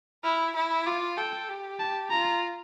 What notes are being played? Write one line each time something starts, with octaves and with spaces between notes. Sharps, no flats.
E4 F6
E4
F4 D6
A4 G5
G4
A5
F4 A#5